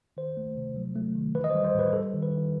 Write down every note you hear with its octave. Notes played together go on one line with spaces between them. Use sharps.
D#3 C5
A3
C3
F#3
A3
D#3
E3 B4
D#5
C5
G3
C5
A2 B4
G3 A4
D#3
B4
D#3